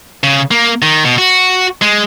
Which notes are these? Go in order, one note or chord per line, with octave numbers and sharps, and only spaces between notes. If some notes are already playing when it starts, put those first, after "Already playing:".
C#3
A#3
D#3
B2
F#4
G#3